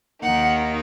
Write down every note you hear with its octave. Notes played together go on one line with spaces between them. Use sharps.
D#2 D#3 A#3 D#4 F#5